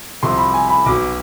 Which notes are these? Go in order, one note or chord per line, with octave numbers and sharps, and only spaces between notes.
C2 C3 F3 C6
B5
G#5
B5
B1 B2 D6